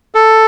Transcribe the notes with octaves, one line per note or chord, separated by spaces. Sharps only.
A4